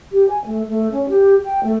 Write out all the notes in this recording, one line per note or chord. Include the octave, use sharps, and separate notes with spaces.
G4
G#5
A3
A3
C#4
G4
G5
A3